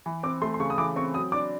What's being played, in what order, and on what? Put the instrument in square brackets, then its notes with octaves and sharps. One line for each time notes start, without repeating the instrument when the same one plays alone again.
[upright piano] E3
[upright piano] C4 [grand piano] D6
[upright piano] A3 [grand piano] C6
[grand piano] C6
[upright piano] C#3 [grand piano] C#6
[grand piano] D#6
[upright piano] E3 [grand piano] D6
[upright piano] C4 [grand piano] C#6
[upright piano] F#3 [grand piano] D#6
[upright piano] D4 [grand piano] D6